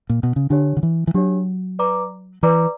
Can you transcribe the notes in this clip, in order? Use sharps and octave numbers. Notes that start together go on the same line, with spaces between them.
A#2
B2
C#3
D3 D4 G4 C#5
D3
E3
E3
F#3 D4 G4 C#5
B4 D5 A#5 D6
E3 B4 D5 A#5 D6